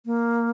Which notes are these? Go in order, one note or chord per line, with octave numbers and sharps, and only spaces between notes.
A#3